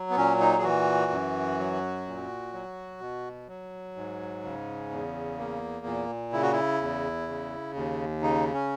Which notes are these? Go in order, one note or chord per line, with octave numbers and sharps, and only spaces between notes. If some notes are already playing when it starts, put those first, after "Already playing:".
Already playing: F#3
B3
A#2 C#4
D#4
G#4
E3 F#4
F#2
F#3
A#2
F#3
B2
F#3
G#2
C#3
E2
A#3
A#2
C#3 E4
F#4
E4
E2
C#3
D#2
C#3 D#4
C#4